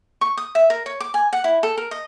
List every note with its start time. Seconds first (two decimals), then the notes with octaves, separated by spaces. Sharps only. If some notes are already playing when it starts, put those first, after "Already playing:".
0.21 C#6
0.37 D#6
0.55 E5
0.70 A#4
0.86 C#5
1.00 D6
1.14 G#5
1.33 F#5
1.44 E4
1.63 A4
1.77 A#4
1.91 D#5